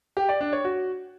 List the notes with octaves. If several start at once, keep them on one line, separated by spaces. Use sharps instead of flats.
G4
D5
D4
C#5
F#4